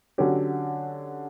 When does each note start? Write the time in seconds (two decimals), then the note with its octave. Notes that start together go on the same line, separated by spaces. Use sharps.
0.18 D3 F#3 C#4 G4